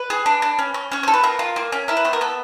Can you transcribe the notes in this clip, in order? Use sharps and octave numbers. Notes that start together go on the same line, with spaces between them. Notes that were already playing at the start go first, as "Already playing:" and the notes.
Already playing: B4
G#4
D4
D4
C#4
C#4
C#4 C#5
A4 C5
B4
F4 A#4
F4
A#3
C#4
E4 A#4
B4
B3 C5
A#4
B3 A4